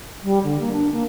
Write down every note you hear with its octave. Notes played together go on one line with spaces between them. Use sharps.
G3
D3
A#3
D4
A#3